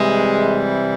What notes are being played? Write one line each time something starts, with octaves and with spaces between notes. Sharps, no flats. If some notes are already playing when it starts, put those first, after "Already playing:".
Already playing: C3 E3 G3 G#3